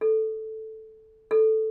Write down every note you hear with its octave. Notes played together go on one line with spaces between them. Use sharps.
A4
A4